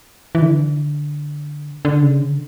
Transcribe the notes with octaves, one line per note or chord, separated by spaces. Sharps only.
E3
D3
D3
C#3
D3